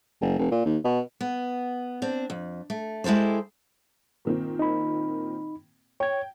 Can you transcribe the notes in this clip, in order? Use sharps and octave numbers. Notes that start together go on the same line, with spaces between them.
F#1
F1
A#2
D#2
B2
B3
C4 D4
F2
A3
G#3 E4 G4 A4 C5
A#2 D#3 C4
D#4 B5
C#5 G5 G#6